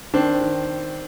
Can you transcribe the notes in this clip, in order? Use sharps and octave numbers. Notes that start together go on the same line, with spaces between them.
D#3 C4 D4
D#3